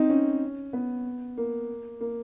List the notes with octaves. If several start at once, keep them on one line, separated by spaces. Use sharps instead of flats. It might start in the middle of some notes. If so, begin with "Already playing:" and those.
Already playing: C4 D#4
C#4
B3
A#3
A#3